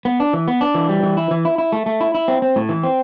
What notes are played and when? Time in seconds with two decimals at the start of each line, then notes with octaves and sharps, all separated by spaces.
0.05 B3
0.20 D4
0.33 E3
0.48 B3
0.61 D4
0.75 E3
0.89 G3
1.03 E3
1.17 E4
1.31 E3
1.45 E4
1.58 E4
1.72 A3
1.86 A3
2.01 E4
2.15 E4
2.28 C4
2.42 C4
2.56 A2
2.69 E3
2.83 C4